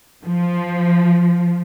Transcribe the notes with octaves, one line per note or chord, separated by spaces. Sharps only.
F3